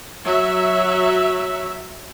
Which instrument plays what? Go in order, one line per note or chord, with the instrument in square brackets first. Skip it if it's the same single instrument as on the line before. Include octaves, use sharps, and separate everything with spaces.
[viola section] F#3 E5